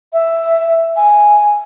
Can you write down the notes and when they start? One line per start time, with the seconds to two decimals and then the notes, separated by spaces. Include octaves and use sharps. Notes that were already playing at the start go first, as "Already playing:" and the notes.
0.13 E5
0.96 G#5